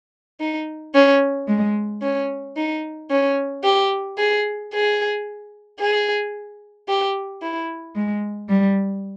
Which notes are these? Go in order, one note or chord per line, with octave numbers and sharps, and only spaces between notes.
D#4
C#4
G#3
C#4
D#4
C#4
G4
G#4
G#4
G#4
G4
E4
G#3
G3